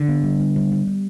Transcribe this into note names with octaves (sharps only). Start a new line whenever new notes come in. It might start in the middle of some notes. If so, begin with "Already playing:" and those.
Already playing: D3
B3
G3
G3
G3
G3
G3